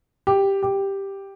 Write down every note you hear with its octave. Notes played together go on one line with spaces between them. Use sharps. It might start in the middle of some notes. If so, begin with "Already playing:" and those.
G4
G4